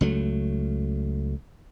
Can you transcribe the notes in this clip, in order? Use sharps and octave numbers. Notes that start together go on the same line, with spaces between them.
C#2 F#3 A3